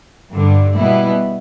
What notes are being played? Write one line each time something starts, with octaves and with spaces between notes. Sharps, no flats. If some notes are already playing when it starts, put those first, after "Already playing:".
G2 D3 G3
B2 G3 B3 E4